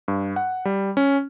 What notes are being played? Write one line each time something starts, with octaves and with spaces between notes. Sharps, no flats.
G2
F#5
G3
C#4